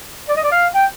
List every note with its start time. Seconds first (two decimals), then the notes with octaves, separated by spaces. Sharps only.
0.28 D5
0.36 D#5
0.43 D5
0.51 F5
0.74 G5